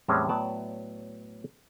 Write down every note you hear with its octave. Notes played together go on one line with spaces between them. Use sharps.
E2 A2 G3 G#3 C4 C#4
A2 F#3 B3 D5 A5